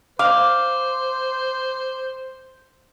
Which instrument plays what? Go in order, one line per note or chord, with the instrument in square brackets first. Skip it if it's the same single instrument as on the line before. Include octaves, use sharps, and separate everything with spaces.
[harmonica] C5 [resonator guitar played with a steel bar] F5 [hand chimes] D6